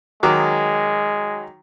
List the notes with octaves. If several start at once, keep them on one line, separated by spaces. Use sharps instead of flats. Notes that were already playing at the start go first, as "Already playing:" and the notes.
D#3 F#3 G#3 D6